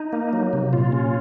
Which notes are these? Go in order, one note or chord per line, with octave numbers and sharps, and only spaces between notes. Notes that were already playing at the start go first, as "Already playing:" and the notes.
Already playing: D#4
A#3
F#3
C3
A#2 F4
C#4